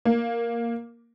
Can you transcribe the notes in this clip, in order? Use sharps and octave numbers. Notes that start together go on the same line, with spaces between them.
A#3